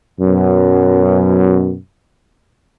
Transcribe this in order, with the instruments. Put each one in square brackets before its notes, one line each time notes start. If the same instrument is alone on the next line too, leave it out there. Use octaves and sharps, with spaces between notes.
[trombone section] F#2 B2